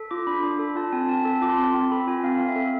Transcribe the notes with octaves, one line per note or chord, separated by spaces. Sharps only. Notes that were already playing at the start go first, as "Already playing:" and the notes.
Already playing: A4
F4 D6
D4 B5
D4
A4
F4 A5
C4 G#5
C4 A5
A4 A5
F4 D6
C6
C4
C4
A4 B5
F4 G#5
C4 F5
C4 F5
E5
A4